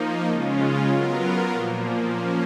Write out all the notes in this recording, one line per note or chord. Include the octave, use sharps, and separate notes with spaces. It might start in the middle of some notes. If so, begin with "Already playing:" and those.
Already playing: F3 A#3 D#4
C#3 G#3 C#4 F4
F#3 B3 F4 A#4
A#2 F3 A#3
F3 A#3 C#4